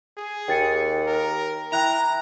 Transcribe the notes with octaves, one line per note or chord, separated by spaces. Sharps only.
G#4
D#2 G5 A6 C#7
A#4
E4 G5 A#5 F#6 F7